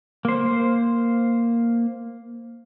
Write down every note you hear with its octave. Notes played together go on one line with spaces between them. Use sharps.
A#3 C5